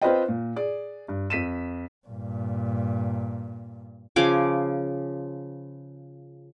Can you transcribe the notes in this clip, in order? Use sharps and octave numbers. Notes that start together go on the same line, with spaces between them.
C4 F4 B4 C5 D#5 G5
A#2
G#4 D5
G2
F2 B6 D#7 E7
G2 A#2
C#3 F3 G#5 D6